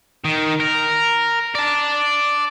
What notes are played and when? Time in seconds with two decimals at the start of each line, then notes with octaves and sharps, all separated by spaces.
0.25 D#3
0.60 A#4
1.55 D5 A5